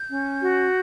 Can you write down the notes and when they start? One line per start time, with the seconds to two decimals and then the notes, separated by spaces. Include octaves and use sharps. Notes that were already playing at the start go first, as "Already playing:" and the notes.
Already playing: G6
0.10 C#4
0.41 F#4